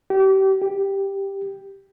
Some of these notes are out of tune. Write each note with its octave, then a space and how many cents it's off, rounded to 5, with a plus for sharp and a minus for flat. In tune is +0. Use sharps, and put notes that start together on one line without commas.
G4 -30
G4 +5